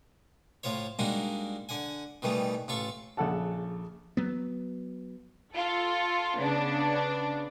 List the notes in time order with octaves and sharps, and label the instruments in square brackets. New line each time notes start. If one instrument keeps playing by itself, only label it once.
[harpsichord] A2 F4 C5 C#5
G3 G#3 A#3 D4 D#4 F#4
D3 F#5 G#5
B2 D#3 E3 G3 A3
A1 F4 A4 C#6
[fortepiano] A#1 C#3 A4 F#5 A5
[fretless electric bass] F#3 B3
[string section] F4 A4
C#3 B3 D4